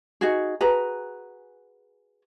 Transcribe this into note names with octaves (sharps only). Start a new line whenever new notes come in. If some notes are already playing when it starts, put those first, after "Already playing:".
D#4 F#4 G#4
F#4 G#4 B4 A#5